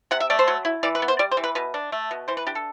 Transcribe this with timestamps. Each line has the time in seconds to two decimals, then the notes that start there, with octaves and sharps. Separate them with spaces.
0.11 C3 F#5
0.20 E5
0.30 A3 D5
0.39 C5
0.48 F#3
0.65 E4
0.83 E3 D5
0.95 B4
1.02 B3
1.08 C5
1.19 G3 D5
1.31 C5
1.37 E3
1.44 B4
1.55 B2 B4
1.74 D4
1.92 A3
2.11 B2
2.28 E3 C5
2.37 B4
2.47 D4 G4
2.55 A4